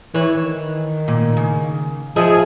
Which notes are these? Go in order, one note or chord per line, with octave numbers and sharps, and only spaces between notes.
E3 C#5
D#3
A#2
C#3
F3 G#4 D#5 E5